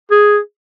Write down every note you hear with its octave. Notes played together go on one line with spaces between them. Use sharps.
G#4